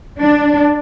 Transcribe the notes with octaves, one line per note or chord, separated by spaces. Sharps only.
D4